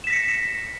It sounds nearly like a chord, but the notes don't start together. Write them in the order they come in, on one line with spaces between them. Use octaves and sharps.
E7 B6 A#6 C#7